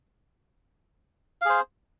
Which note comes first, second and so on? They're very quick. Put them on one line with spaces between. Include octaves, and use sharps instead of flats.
F5 G#4 C5